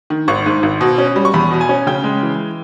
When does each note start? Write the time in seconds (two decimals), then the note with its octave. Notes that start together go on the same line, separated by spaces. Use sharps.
0.10 D#3
0.28 G#1 C#6
0.46 G#2
0.63 G#1
0.81 B2
0.98 C#4
1.16 G3
1.25 C#6
1.34 E2 B5
1.51 B2
1.61 G#5
1.69 C#4
1.87 C#3 G5
2.04 G#3
2.23 E3